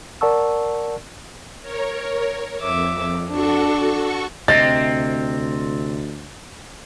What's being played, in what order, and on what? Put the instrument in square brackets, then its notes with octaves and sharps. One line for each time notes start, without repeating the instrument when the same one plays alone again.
[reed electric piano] A#4 D5 F#5 A5 C#6 E6
[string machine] A#4 C#5
[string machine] F2 [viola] E5 D6
[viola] D4 [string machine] F#4 A4 C#6
[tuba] D2 [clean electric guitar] C3 C4 [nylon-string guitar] D#5 [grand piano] A6